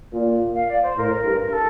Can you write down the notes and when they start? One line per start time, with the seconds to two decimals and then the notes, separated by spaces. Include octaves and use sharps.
0.12 A#2
0.54 F5
0.68 D5
0.82 C5
0.96 A2 A#4
1.24 G2
1.43 A#4
1.52 A4